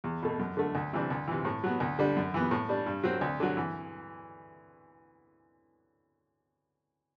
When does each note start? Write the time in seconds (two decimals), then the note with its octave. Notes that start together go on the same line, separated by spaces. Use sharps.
0.04 E2
0.23 B2 A3
0.39 F#2
0.57 D3 A3
0.75 D2
0.93 C3 E3 G3 D4
1.10 D2
1.28 C3 E3
1.45 A2
1.64 F#3 B3
1.80 D2
1.99 D3 G3 D4
2.16 F#2
2.34 E3 B3
2.51 A2
2.69 G3 D4
2.86 G2
3.03 F#3 C4
3.21 D2
3.40 D3 F#3
3.57 E3